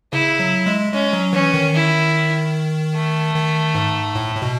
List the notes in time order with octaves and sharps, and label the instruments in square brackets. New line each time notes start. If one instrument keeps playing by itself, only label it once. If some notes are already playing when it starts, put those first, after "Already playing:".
[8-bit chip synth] C#3 [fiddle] E4
[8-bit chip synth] F#3
G#3
[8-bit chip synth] G#3 [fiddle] C#4
[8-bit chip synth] F#3
[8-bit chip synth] E3 [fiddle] C#4
[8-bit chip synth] D#3
[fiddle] E4
A3
[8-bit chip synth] D#3
G#2
A2
A2
B2